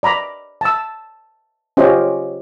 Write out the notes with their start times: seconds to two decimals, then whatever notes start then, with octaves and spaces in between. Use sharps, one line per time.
0.03 D5 A#5 B5 D6
0.61 A5 E6
1.77 C#4 F4 G4 C5 D#5